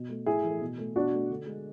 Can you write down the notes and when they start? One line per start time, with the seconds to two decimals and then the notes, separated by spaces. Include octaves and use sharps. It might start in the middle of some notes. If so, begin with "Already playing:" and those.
Already playing: B2
0.09 A3
0.26 A2 E4 G#4
0.43 E3 A3
0.61 B2
0.78 A3
0.96 B2 D4 F#4
1.12 A3
1.30 D3
1.46 G#3